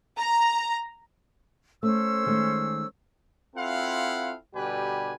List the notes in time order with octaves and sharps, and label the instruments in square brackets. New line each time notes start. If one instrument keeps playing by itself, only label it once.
[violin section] A#5
[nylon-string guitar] A3 [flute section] C#4 C5 E6
[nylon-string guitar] D#3 G#3 A3
[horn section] C4 E4 F4 A4 F5 F#5
B2 D3 G3 G4 B4 G#5